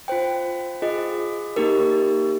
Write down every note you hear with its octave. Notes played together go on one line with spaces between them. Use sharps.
F4 C5 G5
F4 G#4 D#5
A#3 D#4 G4 A#4